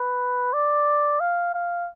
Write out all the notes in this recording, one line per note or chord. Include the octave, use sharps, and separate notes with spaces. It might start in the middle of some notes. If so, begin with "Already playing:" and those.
Already playing: B4
D5
F5
F5